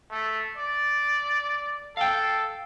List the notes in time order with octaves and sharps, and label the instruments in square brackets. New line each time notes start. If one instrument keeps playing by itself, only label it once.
[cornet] A3
D5
[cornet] A4 [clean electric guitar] F5 G5